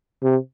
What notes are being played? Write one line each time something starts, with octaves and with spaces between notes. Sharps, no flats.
C3